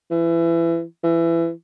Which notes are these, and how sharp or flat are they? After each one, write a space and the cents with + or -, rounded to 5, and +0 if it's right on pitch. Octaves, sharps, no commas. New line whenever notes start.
E3 +25
E3 +20